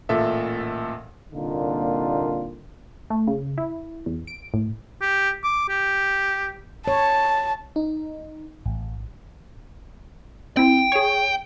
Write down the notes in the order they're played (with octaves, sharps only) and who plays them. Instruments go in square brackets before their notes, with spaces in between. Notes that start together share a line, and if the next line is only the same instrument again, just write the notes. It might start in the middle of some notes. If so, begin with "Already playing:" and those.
[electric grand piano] A1 A#2 A4 E5
[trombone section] C2 A#2 D3 A#3 D#4 F4
[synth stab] A3
C#3
E4
E2
D7
A2
[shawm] G4
D6
G4
[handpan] C#5 [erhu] A5
[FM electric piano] D#4
A1
[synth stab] C4 E4 [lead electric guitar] G5
[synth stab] G#4 C#5